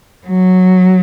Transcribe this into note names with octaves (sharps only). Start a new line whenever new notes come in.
F#3